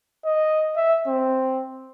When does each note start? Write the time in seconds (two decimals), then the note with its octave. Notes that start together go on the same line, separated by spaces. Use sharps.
0.25 D#5
0.76 E5
1.07 C4